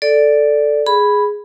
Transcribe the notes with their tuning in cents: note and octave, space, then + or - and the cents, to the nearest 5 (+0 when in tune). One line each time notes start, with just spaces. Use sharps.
A4 +0 D5 +0
G#4 +0 B5 +0